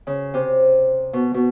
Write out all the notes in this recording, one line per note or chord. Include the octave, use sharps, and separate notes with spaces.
C#3
C3
B2
B2